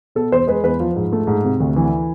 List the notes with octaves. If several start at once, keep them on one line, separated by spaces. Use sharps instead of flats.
B2 A4
E2 C5
G#3 B4
E2 B4
F3 F4
G#2
A3
G#2
C3
D2
E3